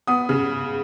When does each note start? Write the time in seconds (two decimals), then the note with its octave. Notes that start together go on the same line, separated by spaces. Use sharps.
0.07 B3 D#6
0.29 C#3